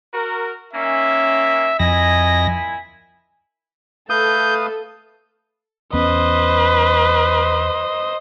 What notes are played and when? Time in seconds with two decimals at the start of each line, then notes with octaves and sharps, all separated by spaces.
0.13 F#4 A#4
0.74 D#3 A#3 C#4 E5
1.80 F2 A#2 E4 D#5 G#5 A#6
4.10 A3 A4 B4 F5 D#6 G6
5.93 E2 B3 C#4 B4 C5 D#5